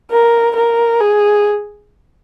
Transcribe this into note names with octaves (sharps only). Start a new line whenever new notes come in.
A#4
A#4
G#4